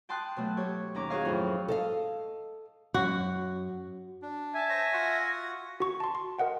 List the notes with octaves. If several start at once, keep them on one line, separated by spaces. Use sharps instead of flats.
G5 A5 C6 D#6 F#6
B2 F#3 A3
G4 C#5
D#2 C#4 A#5 D6
F#4 G#4 A#4 C#5 D#5 F5
F2 A2 F#3
A4 D#5 F5
F#2 F#4
D4
E5 G#5 A5
C5 C#5 A5 A#6
F4 F#4 F#5
F#4 C#6
A5 C6
C6
A#4 D#5 F#5 G5